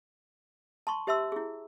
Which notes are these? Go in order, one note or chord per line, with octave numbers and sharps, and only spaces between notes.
A5 C6 C#6
G4 C5 E5 A5 C6 E6
E4 G#4